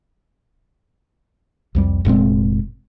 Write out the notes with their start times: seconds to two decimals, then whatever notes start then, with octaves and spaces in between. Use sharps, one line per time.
1.75 C2 F2 G3
2.05 F1 A#2 G#3 C4